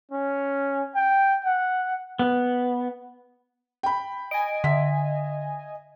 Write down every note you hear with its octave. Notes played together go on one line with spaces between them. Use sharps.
C#4
G5
F#5
B3
G5 B5
D#5 G#5 D7
D3 E5 B6